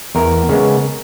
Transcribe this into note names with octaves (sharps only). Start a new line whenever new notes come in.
E2 A#4
C#3 G#3 B3